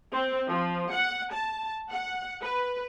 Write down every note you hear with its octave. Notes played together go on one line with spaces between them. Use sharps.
C4
F3
F#5
A5
F#5
B4